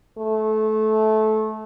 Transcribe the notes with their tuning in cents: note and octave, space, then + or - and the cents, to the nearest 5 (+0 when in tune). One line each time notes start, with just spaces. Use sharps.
A3 -20